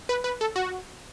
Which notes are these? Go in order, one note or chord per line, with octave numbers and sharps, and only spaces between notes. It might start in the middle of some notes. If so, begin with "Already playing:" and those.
B4
B4
A4
F#4